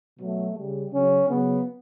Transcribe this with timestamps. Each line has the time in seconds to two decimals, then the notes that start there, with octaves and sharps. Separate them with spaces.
0.18 B2 F#3 A3
0.55 C#3 G3
0.91 C#3 F#3 C#4
1.27 C#3 F#3 B3